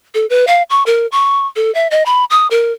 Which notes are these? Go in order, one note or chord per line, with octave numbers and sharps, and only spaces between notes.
A4
B4
F5
C#6
A#4
C#6
A4
E5
D#5
B5
D#6
A#4